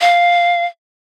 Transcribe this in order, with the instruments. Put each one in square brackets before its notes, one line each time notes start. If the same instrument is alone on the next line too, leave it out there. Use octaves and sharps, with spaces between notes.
[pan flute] F5